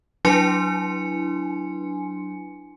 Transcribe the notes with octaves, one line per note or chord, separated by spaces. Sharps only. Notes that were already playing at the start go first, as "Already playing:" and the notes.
F#3 D4 E4 G#5 C6 C#7